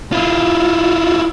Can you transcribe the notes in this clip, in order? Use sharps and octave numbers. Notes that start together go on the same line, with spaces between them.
E4 F4